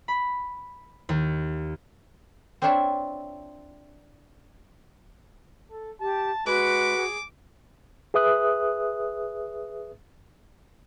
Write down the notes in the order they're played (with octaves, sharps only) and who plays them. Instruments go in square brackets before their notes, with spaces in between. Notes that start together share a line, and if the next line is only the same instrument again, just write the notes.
[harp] B5
D#2
[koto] C4 D4 E4 F4 C#5 E5
[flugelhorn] A4
[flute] G4 [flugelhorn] A5
[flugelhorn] G#3 [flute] F#4 [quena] B4 [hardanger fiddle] D6
[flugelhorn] G#4
[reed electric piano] G#4 B4 E5 D#6 F#6